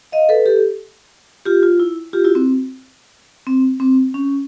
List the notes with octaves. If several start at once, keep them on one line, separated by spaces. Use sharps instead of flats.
D#5 F5
A4 B4
G4 A4
F4 G4
F4
E4
F4 G4
E4 F#4
C4
C4
C4
C#4